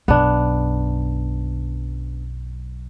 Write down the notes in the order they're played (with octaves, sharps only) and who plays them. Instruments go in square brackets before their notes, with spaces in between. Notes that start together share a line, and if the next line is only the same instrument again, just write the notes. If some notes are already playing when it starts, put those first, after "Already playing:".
[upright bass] B1 F#2 [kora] B3 D4